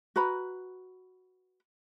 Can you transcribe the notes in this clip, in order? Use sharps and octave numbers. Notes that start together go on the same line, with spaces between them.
F#4 B4 A#5 B5